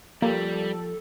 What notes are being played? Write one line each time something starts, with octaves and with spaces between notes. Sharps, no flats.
F3 G3 A#3 G4 A4